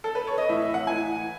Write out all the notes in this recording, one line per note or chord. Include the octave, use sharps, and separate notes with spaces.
A4
B4
C#5
D#5
A2 E3 E5
E5
F#5
A2 E3 G#5